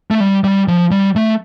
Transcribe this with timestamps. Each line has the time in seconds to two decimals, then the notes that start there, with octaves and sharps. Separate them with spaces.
0.11 A3
0.20 G3
0.44 G3
0.68 F3
0.91 G3
1.16 A3